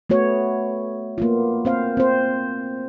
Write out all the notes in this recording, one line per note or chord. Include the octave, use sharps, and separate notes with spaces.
A3 B3 F#4 C#5
A#3 B3 F4
C4 C5 F5
C4 C5